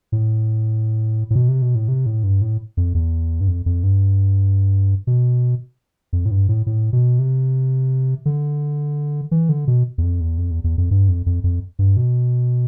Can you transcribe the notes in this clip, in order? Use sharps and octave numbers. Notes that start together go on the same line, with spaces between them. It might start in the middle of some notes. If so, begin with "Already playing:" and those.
A2
A2
B2
C3
B2
A2
C3
A2
G2
A2
F2
E2
G2
F2
F2
G2
B2
F2
A2
G2
A2
A2
B2
C3
D3
E3
D3
B2
E2
F2
E2
F2
E2
E2
F2
G2
F2
F2
F2
G2
B2